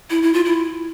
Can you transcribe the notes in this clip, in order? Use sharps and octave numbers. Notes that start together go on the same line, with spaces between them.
E4
E4
F4
E4